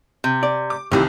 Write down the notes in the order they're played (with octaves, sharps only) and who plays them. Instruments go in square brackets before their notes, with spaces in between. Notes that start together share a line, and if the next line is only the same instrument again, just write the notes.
[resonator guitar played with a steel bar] C3
[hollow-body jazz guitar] D5
[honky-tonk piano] D6
[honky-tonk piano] C2 C3 D#3 [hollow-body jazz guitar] G2 E3 E4